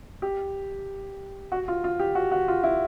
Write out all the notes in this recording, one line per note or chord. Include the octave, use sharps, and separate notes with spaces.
G4
F#4
F4
F4
G4
F#4
F#4
F4
E4